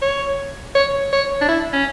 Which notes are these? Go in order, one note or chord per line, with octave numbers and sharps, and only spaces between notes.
C#5
C#5
C#5
D4
E4
C#4